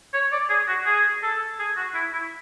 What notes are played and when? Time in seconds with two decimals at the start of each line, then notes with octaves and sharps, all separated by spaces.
0.14 C#5
0.32 D5
0.49 G#4
0.68 F#4
0.86 G#4
1.23 A4
1.59 G#4
1.76 F#4
1.95 E4
2.13 E4